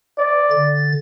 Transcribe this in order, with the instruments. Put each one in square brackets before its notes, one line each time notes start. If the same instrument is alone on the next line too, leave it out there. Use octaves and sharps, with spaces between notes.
[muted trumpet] D5
[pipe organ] D3 A6